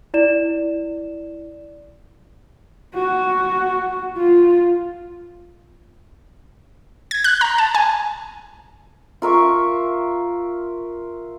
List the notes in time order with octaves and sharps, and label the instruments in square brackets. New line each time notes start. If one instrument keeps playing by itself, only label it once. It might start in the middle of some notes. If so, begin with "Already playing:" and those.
[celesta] E4 D5 E7
[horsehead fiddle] F#4
F4
[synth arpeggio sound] G#6
F#6
A#5
A5
G#5
[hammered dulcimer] F4 A#4 E5 C#6